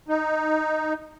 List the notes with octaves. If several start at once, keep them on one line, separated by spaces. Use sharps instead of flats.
D#4